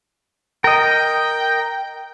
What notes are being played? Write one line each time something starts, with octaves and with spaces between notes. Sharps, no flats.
A#4 D#5 G5